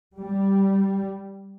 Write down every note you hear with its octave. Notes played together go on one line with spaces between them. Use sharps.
G3